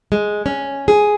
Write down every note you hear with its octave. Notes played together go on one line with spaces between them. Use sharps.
G#3
C#4
G#4